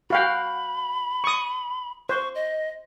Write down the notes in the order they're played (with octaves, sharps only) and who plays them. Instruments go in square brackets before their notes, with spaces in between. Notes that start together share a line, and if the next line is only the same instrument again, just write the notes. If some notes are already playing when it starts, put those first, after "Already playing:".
[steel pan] F#4 F5 G5 [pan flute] B5
[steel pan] C#6 D#6
[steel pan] C5 [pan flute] C#6
[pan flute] D#5